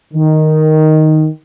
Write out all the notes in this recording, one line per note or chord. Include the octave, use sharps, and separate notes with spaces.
D#3